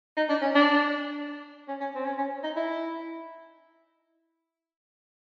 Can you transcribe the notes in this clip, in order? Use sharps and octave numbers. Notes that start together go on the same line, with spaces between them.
D#4
D4
C#4
D4
C#4
C#4
C4
C#4
C#4
D#4
E4